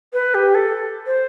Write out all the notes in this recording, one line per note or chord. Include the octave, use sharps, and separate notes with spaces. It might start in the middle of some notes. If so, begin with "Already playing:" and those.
B4
G4
A4
C5